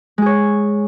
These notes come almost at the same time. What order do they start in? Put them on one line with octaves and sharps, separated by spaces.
G#3 G#4 C#5